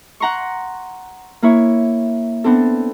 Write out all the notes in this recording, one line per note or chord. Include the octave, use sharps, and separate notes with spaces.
F#5 A#5 C6 C#6
A#3 E4 C#5
B3 C4 D4 A4